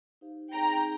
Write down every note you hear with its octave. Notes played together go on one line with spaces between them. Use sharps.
D#4 G4 C5 F5
C4 D#4 G#4 C#5 G5 A#5